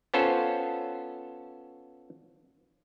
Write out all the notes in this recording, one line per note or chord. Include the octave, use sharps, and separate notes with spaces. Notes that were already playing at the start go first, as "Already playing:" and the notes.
B3 C#4 F4 A4 C5